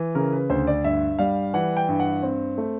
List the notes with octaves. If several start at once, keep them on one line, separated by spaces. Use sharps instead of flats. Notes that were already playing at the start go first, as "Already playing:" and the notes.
Already playing: E3
C#3 A#4
B4
D2 C5
D5
G2 E5
G3 F5
E3 F#5
G5
G2
F#5
C4
A3